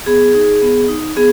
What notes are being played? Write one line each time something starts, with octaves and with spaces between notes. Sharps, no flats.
B3 G#4
D#4
B3
D#4
B3 G#4